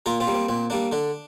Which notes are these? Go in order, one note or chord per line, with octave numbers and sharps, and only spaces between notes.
A#2 F4 A#4
C4 F4
G3 A#3
C4
A#2 C4
G3 A#3 D4
D3 D4